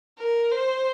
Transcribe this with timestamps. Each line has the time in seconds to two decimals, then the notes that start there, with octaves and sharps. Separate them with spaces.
0.18 A#4
0.51 C5